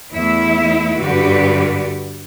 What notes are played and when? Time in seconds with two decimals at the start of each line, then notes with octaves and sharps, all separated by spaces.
0.13 E2 A3 E4 E5
1.00 G2 D3 F#4 G4 B4 D5